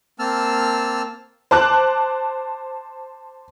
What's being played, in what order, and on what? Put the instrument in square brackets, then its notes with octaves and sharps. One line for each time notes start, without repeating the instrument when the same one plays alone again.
[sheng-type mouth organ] A#3 C4 A5 E6 F6
[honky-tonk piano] C5 A5 D6 F#6